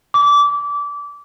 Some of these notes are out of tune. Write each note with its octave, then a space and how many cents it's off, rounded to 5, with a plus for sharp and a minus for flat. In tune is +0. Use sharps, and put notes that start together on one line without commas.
D6 -25